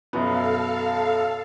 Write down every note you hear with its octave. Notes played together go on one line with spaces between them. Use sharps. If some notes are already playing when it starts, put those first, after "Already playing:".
F#2 B2 B3 A4 F5